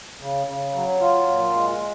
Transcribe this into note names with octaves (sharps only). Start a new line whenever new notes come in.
C#3
C#3
F#3
F4
A#2
G#3